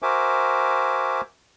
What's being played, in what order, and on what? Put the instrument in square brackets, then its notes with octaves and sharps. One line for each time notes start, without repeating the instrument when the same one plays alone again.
[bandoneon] F#4 A#4 C5 E5 G#5 D6